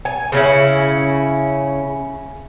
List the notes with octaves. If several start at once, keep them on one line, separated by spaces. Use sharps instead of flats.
G#5
C#3 C#4 E4